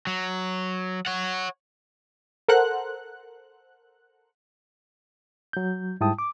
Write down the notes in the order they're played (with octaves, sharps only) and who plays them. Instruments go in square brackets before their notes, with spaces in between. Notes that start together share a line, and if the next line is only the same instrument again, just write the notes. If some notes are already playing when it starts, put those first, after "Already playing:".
[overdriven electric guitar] F#3
C#5 F#5
[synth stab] A4 A#4 C5 F#5 F#6
[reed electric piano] F#3 G6
G#2 G3 E4 G5 A5 D#6
D6